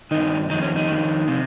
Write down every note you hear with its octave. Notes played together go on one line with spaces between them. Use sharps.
G2 D#3 D#4
F2 D#3 D#4
C#4
D#4
F2 D#3
C3